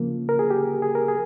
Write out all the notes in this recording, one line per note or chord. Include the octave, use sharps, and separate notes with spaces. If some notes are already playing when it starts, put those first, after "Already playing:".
Already playing: C#3 F3 A#3
A#4
G#4
G4
G#4
A#4
G#4